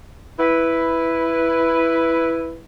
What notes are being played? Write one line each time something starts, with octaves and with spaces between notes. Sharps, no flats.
E4 B4